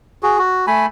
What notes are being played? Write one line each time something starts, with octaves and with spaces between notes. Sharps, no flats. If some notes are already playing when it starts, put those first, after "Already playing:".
F#4 G#4
F#4
A3 G#5 B5